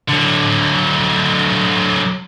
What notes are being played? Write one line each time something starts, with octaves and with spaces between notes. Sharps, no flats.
D3 F#3